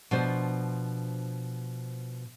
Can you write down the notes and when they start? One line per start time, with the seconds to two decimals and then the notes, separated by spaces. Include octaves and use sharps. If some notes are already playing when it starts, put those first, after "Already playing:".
0.11 B2 F3 D4 C5